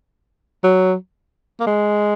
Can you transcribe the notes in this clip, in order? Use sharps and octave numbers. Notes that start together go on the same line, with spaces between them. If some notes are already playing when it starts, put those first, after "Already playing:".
F#3
A#3
G#3